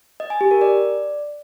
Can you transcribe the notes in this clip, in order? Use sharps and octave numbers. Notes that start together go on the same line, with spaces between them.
D#5
G#5
G4
A#4
D5